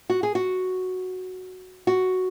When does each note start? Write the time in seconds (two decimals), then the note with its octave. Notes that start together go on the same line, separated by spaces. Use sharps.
0.10 F#4
0.23 G#4
0.35 F#4
1.87 F#4